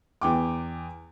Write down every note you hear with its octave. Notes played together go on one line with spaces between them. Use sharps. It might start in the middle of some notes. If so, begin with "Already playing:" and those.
E2 G5 D6